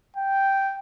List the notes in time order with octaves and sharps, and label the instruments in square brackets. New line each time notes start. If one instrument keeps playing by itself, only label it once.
[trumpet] G5